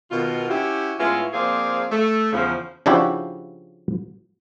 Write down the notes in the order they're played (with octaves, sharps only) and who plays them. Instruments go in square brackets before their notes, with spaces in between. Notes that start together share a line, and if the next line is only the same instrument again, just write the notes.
[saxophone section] B2 D#3 F4
C#4 E4 F#4 G4
A2 G#3 B3 C#4 E4 F4
F3 A#3 C4 G#4 D5 F5
A3
E2 C#3 F3
[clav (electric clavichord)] C#3 F3 D4 E4 F#4 G4